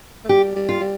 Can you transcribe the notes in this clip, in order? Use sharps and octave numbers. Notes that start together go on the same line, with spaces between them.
A3
G3 G4
G3
F4
G3